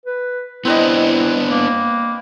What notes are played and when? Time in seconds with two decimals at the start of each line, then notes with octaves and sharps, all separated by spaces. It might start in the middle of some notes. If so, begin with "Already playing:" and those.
0.06 B4
0.65 B3 C4 D4 E4 B4 D#5
1.49 A#3